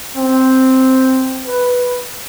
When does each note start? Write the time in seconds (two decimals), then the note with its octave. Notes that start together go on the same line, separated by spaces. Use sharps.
0.16 C4
1.46 B4